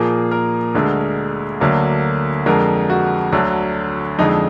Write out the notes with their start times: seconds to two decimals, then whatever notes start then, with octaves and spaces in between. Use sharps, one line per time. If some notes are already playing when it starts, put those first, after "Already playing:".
Already playing: A#2 F3 A#3 G#4
0.31 A#4
0.75 D2 D3 G#3
1.60 D2 D3 F#3 A#3
2.46 F2 D3 G#3 A#4
2.90 F#4
3.32 D2 D3 F#3
4.19 F2 D3 G#3 D#4